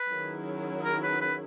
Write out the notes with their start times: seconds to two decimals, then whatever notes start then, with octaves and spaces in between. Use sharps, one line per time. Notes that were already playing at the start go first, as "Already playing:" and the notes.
Already playing: B4
0.09 D#3 F#3 C#4 E4 G#4
0.84 A#4
1.03 B4
1.21 B4